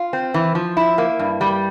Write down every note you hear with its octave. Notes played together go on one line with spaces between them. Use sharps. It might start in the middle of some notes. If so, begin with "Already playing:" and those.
Already playing: F4
C4
E3
F3
E4
A#3
G2
G3